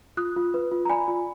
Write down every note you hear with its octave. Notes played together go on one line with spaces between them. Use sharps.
F4 D#6 F#6
F4
B4
F4
A#5
D5 G#5 B5
F4